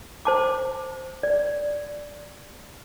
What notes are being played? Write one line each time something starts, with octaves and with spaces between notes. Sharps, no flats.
C5 A5 D6
D5